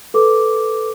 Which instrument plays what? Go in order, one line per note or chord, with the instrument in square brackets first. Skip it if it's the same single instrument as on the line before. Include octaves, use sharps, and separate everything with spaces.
[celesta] A4 B4 D6